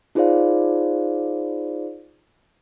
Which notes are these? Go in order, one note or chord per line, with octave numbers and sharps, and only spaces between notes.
D#4 F4 G#4 C5 D5 F5